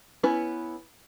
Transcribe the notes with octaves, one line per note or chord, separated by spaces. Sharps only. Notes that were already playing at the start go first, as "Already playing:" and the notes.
B3 C#4 E4 B4